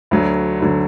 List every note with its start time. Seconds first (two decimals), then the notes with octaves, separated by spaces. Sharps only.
0.11 D2 D3 F#3
0.60 D2 D3 F#3